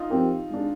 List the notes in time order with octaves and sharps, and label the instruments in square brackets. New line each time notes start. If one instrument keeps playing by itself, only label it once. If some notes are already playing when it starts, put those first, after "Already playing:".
Already playing: [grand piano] D#4 F4
[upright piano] F3 C4 G4 A#4
G#3 D4 G#4